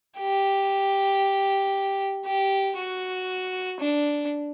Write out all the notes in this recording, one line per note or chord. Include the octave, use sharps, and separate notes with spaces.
G4
G4
F#4
D4